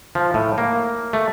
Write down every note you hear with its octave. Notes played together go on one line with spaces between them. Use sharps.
F3
A2
A#3
A3